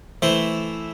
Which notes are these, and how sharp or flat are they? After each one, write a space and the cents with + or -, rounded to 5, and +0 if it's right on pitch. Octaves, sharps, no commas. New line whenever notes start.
E3 +0 A3 -5 C5 +0